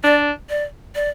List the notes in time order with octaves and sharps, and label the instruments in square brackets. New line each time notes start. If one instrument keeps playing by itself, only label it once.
[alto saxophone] D4 [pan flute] D5
[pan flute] D5
D5